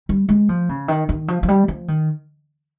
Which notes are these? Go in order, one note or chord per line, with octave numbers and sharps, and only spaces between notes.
G3
G#3
F3
C#3
D#3
D#3
F3
F3
G3
F3
D#3